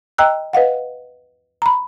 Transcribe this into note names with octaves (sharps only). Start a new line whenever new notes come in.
D#5 G5 A#5 E6 F#6
B4 D#5 F5 F#5
A#5 B5